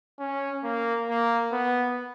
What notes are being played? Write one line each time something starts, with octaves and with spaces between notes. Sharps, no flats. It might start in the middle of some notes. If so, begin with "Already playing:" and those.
C#4
A#3
A#3
B3